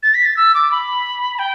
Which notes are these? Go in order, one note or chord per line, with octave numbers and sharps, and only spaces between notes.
A6
B6
A6
E6
D6
B5
G5